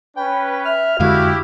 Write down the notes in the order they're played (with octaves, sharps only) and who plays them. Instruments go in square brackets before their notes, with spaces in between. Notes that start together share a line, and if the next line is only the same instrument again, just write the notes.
[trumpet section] C#4 B4 [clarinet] G5
[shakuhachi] E5 [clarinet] F6
[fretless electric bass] F2 D3 G#3 [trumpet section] E4 G4 [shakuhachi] F#4 [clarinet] F5